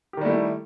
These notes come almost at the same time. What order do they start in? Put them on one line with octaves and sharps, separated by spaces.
G4 D#3 G3 A3 E4